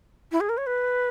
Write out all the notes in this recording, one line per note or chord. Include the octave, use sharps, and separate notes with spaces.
E4
G#4
A#4
C#5
B4